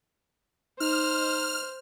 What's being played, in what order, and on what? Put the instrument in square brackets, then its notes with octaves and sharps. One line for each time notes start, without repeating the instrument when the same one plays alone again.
[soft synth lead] D#4 [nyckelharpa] C5 [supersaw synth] F6